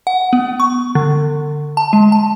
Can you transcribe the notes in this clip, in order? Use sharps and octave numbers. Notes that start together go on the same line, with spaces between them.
F#5
B3
C#6
D3
A5
G#3
A5